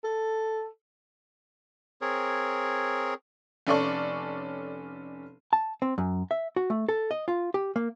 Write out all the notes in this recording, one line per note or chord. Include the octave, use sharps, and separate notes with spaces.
A4
C4 G#4 A#4 C#5
F1 C#4 A4 D5 A5 C#6
A5
C4
F#2
E5
F#4
A3
A4
D#5
F4
G4
A#3